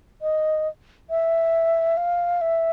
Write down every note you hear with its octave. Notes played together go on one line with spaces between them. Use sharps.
D#5
E5
F5
E5